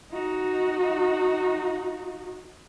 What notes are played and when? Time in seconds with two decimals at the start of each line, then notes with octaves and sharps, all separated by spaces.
0.12 D#4 F#4